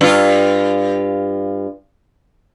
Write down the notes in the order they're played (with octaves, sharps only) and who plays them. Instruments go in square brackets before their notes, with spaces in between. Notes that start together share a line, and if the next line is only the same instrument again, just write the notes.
[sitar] G2 F4